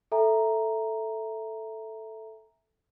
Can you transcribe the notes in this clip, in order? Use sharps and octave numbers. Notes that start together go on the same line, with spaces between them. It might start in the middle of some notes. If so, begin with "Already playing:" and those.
A4 E5 G#5 A#5